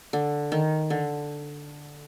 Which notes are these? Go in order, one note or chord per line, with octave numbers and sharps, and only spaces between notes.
D3
D#3
D3